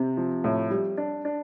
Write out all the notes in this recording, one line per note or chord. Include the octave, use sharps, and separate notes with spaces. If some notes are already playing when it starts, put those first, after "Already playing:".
Already playing: C3 C4
F3
A2
G3
D4
D4